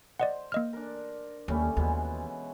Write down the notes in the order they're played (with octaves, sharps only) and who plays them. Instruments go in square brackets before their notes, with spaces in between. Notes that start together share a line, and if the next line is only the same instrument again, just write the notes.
[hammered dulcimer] C5 [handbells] D5 D#5 F#5
[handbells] A#3 D#5 F6
[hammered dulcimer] D4 A#4
[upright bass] D#2 [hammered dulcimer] G3 A3 C#4
[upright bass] D#2 [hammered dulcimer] B2 E3 G#3